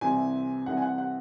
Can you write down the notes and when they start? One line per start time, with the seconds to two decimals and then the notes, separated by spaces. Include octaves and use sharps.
0.01 C2 C3 E3 C4 G#5
0.66 C2 C3 E3 C4 F#5
0.77 G#5
0.82 F#5
0.98 F#5